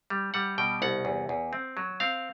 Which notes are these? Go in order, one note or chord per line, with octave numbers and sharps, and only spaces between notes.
G3
G3 F#5
B2 G5
C2 F#5
E2
E2
C4
F#3
C4 F5